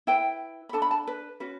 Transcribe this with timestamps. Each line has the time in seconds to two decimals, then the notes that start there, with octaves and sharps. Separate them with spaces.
0.07 E4 B4 G5
0.69 B5
0.73 D4 A4 A5
0.82 B5
0.91 A5
1.07 B4
1.40 C#4 F#4 B4